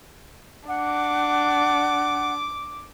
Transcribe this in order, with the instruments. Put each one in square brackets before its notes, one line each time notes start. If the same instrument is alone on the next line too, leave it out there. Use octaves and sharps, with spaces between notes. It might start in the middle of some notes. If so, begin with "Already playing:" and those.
[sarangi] D4 [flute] F#5 [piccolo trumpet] D6